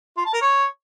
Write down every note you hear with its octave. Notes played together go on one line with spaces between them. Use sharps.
F4
A5
A#4
C#5